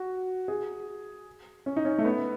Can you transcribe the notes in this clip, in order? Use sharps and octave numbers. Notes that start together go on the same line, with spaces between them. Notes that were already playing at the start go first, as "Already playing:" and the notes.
Already playing: F#4
G#4
C#4
D#4
C#4
A3
B3